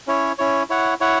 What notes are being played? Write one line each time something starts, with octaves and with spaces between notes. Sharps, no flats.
C#4 E4 C#5
C#4 E4 C#5
E4 C#5 F#5
E4 C#5 F#5